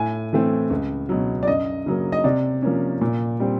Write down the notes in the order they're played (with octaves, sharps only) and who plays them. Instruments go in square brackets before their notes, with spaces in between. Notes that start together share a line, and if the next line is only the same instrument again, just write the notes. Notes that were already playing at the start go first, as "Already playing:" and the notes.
Already playing: [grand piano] A2 G#5
E3 A3 C4
C#2
B2 F#3
D5
F#2 D#5
C#3 F#3 A#3
D#5
C3 D5
F3 A#3 C#4
A#2
G3 C4